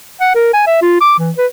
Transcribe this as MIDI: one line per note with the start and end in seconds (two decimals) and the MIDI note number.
0.20 0.32 78
0.35 0.49 70
0.53 0.63 80
0.66 0.78 76
0.82 0.99 65
1.01 1.15 86
1.19 1.31 52
1.38 1.46 71